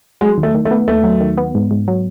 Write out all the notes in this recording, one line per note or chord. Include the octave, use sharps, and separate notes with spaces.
F#3 G#3
D#2
A3
D#3
A3
B3
D#2 A3
F#3
D#3
B3
G#2
G#2
F#3